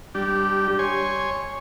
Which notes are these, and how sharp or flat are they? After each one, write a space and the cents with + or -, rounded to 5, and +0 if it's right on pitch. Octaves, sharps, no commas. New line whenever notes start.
G3 +0 D4 +0 G4 -20
C#5 +0 G#5 -5 C6 +0